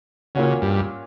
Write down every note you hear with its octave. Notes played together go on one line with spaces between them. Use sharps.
A#2 C#3 A#3 C#4 F#4
G2